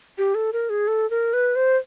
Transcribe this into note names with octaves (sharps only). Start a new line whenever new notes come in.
G4
A4
A#4
G#4
A4
A#4
B4
C5